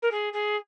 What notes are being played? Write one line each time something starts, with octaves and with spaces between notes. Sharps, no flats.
A#4
G#4
G#4